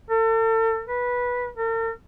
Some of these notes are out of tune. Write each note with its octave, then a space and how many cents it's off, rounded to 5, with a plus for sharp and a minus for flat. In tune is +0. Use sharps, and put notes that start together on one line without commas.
A4 +40
B4 -15
A#4 -45